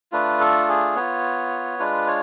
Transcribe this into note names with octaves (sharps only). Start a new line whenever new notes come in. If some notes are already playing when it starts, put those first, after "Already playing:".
A3 D4 F4 B4
A4
G#4
B3 F4 C#5
G#3 D4 F4 B4
C#5